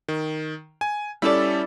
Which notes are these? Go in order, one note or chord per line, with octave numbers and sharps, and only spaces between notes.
D#3
G#5
G3 C#4 E4 A4 D5